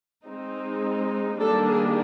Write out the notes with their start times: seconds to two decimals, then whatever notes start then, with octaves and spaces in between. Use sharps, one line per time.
0.24 G#3 C4 D#4
1.40 D#3 G3 A#3 D4 A4
1.68 G#4